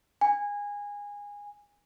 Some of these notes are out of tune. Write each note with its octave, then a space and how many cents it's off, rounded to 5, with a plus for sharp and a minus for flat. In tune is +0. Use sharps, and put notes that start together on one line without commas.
G#5 -20